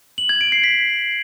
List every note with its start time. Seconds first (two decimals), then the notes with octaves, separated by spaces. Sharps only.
0.18 F#7
0.29 G#6
0.41 D7
0.52 C7
0.64 B6